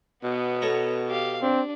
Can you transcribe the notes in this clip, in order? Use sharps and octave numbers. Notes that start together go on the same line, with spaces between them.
B2 B3
A4 C#5 A#5
G4 F5
C4 D4